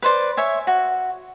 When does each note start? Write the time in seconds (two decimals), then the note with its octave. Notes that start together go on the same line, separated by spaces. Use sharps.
0.02 B4 C5 D5
0.37 C#5 E5 G#5
0.67 F#4